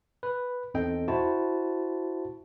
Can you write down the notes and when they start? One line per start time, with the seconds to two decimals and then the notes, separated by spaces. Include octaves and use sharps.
0.23 B4
0.74 E2 C4 D#4 A4 D#5 G5
1.08 E4 F#4 C5 A5